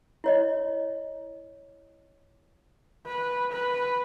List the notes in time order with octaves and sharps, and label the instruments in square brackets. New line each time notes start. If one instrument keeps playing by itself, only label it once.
[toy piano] E4 C#5 D#5
[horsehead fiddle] B4
B4